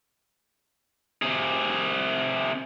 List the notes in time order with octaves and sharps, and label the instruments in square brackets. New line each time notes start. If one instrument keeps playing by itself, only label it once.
[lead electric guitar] C3 G#4